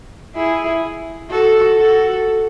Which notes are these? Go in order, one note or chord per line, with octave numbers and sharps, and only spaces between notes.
E4 G#4
F#4 A4
F#4 A4